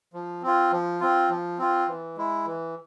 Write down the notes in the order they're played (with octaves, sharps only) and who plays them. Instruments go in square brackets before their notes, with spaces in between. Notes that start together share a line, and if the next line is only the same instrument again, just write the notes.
[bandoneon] F3
C4 F4
F3
C4 F4
F3
C4 F4
E3
G#3 E4
E3